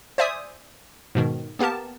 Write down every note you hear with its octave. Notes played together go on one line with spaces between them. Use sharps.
C5 D5 E5 G#5 D#6
G#2 B2 D#3
A#3 B3 G4 A#4 A5